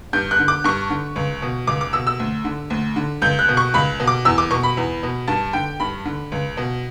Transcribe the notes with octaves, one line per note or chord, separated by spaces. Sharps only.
G2 G6
F#6
D3
D6
G2 C#6
D3
C#2
B2
C#2 D6
D6
B2 E6
E6
D2
D3
D2
D3
C#2 G6
F#6
B2
C#6
C#2 B5
B2
D6
E2 E6
D6
B2 C#6
B5
E2
B2
G2 A5
D3 G5
G2 B5
D3
C#2
B2